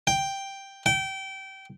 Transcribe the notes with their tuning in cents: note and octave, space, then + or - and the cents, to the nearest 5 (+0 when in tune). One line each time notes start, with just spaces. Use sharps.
G5 +5
G5 -20